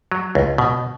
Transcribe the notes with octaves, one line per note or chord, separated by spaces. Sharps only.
F#3
C#2
B2